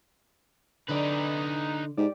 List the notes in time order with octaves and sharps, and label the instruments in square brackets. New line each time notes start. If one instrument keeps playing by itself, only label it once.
[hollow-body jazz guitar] D3 D5 [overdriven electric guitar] D#4 B4
[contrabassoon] G#2 [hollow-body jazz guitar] G4 D5